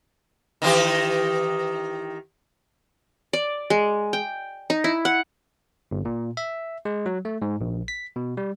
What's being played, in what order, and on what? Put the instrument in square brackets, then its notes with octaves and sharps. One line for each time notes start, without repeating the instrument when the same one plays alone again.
[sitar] D#3 E3 G4
[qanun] D5
G#3
G5
D#4
E4
F#5
[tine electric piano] G1
A#2
E5
G#3
F#3
A3
G#2
A#1
B6
B2
G3